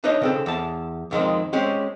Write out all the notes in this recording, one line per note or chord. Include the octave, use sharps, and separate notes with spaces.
D4 D#4 B4 C#5 D#5
C#3 C4 A4
E2 A5
F2 D#3 G#3 C4
G#3 C4 C#4 G4